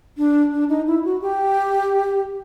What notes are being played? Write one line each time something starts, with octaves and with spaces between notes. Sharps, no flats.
D4
D4
D#4
E4
F#4
G4